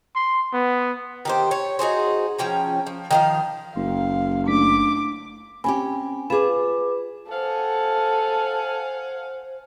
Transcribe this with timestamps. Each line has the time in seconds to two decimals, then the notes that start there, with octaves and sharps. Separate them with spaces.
0.15 C6
0.53 B3
1.25 D#3 G4 C5
1.51 C#5
1.79 D#4 F#4 G#4 C5
2.38 F3 C#4 G5 A#5
2.87 F3
3.11 D#3 F3 F5
3.76 F#1 F5 C6
4.48 A3 D4 D6 B6
5.64 C4 C#4 G4 G#5 B5
6.30 F4 G#4 B4 B5 D6 E7
7.31 A4 C5 F5 F#5 G#5